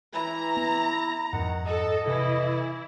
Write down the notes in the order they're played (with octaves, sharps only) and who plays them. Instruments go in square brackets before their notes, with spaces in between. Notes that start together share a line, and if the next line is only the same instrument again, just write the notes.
[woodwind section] E3 [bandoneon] E4 [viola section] A#5
[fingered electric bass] B3
[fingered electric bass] F2 G#2 [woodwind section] D#3 [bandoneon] F#5
[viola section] A4 [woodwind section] D#5
[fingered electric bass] C3 [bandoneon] E3 [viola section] E4